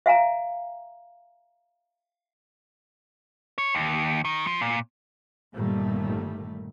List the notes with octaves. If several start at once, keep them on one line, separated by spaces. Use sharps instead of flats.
E5 F5 G#5 A#5
C#5
D#2
D#3
F3
A#2
G1 A#2 D#3 G3 A3